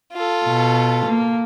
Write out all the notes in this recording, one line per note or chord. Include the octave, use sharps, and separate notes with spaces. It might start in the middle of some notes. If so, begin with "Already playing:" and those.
F4 A4
B2
A#3